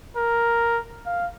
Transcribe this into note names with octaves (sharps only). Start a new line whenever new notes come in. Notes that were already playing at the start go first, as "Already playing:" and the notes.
A#4
F5